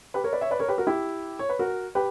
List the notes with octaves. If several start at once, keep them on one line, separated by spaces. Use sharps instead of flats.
G4 B4
A#4 C#5
B4 D5
C#5 E5
B4 D5
A#4 C#5
G4 B4
F#4 A#4
E4 G4
C#5
B4
F#4 A#4
G4 B4